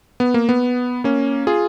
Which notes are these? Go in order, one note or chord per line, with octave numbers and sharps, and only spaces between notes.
B3
A#3
B3
A#3 C#4
F4 G#4